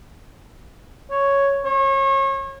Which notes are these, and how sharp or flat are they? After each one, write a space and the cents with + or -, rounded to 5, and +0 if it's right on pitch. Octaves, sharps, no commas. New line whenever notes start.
C#5 +0
C#5 -35